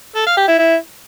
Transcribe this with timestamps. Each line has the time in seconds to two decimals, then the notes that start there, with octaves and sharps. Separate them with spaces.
0.16 A4
0.26 F5
0.37 G4
0.48 E4
0.58 E4